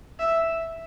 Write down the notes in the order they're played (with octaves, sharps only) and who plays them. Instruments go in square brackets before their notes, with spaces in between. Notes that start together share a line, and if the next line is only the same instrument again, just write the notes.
[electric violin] E5